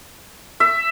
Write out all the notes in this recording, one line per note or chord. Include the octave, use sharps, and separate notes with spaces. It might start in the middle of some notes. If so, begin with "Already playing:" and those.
E5